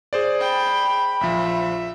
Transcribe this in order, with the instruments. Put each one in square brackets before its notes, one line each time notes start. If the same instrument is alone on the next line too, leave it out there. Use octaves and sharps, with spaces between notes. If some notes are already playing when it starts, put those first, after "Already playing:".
[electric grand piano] G#4 C5 D5
[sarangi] G5 [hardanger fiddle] B5
[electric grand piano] A#1 F3 [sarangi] E5